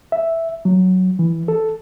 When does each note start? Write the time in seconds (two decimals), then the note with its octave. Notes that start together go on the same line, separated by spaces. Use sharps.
0.12 E5
0.65 F#3
1.19 E3
1.48 A4